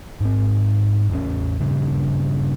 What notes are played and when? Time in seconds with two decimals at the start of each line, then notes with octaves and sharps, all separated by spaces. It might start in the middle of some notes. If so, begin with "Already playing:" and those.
0.20 G#2 C4
1.10 A1 E2 G2 C#4
1.61 G2 A#2 C#3